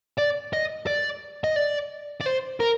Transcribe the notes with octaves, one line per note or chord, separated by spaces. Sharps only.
D5
D#5
D5
D#5
D5
D5
C5
A#4